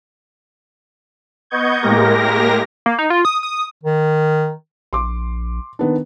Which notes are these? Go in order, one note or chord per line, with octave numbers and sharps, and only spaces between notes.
B3 D#5 C#6 G6 G#6
A2 G#3 A#3 G4 A#4 A#6
A#3
D#4
F4
D#6
D#6
D#3
A#1 C6 D6
D#3 B3 D4